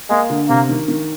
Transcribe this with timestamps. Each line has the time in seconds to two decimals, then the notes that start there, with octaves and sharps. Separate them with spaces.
0.10 G#3 A#3
0.30 D3
0.49 C3 A#3
0.69 D#3
0.88 D#3